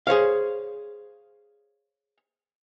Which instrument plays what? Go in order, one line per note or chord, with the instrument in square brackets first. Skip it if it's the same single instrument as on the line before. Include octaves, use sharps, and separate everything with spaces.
[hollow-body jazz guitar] G#4 C5 C#5 F5